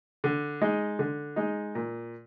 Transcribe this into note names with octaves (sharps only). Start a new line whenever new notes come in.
D3
G#3 D#4
D3
G#3 D#4
A#2